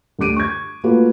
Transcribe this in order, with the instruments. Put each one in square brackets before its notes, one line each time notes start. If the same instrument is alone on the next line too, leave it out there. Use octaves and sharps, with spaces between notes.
[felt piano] D2 D3 G4 D6 D7 D#7
C#6 G#6
A3 A#3 F4 F#4 A4 B4